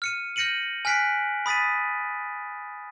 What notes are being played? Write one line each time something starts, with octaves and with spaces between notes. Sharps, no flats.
F6 C#7 D#7
F6 G6 A#6 C#7 D#7 F#7
G#5 F6 F#6 B6 C7 D7
B5 D#6 A6 B6 D#7